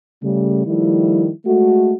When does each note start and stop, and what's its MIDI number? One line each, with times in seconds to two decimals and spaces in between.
0.23 0.64 49
0.23 0.64 55
0.23 0.64 57
0.66 1.30 51
0.66 1.30 53
0.66 1.30 55
0.66 1.30 57
0.66 1.30 64
1.46 1.93 56
1.46 1.93 57
1.46 1.93 66